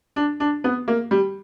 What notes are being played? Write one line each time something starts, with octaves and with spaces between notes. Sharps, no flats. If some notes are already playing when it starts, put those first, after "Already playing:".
D4
D4
B3
A#3
G3